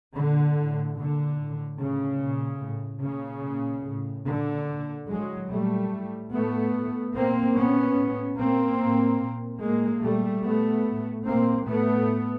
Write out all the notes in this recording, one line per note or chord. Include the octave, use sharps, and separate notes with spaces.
A#2 D3
A2
A#2 D3
A2
A2 C#3
A#2
A2
A#2 C#3
A#2
A2
A#2 D3
A#2
A2 F#3 G#3
A#2 G3 A3
A2
A2 A3 B3
A2
A#2 A#3 C4
A#2 B3 C#4
A2
A#2 A#3 C4
A2
A#2
A2 G#3 A#3
A#2 G3 A3
A#2 A3 B3
A2
A#2 A#3 C4
A2 A3 B3